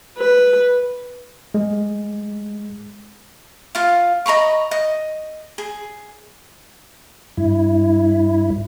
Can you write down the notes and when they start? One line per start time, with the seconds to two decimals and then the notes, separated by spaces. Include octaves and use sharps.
0.17 B4
1.54 G#3
3.75 F4 F5
4.26 D#5 A#5 B5 C#6
4.71 D#5
5.58 G#4
7.37 G2 E4